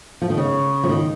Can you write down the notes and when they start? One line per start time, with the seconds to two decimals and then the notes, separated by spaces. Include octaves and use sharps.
0.22 F3
0.30 D#3
0.37 C#3
0.83 F3
0.89 D#3